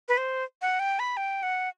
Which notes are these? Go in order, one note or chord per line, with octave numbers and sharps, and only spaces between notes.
B4
C5
F#5
G5
B5
G5
F#5